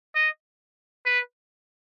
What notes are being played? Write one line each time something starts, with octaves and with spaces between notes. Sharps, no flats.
D#5
B4